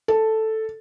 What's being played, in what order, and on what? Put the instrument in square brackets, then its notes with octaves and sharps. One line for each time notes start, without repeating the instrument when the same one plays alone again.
[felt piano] A4